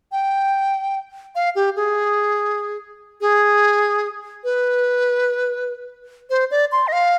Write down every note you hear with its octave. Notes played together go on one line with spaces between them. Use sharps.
G5
F5
G4
G#4
G#4
B4
C5
D5
C6
D#5
F5